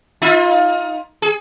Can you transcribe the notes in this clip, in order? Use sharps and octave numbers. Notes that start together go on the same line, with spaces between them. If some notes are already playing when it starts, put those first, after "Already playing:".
D#4 F4
G#4